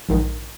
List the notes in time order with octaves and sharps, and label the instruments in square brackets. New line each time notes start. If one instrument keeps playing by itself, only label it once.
[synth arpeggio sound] A#1 G#2 D#3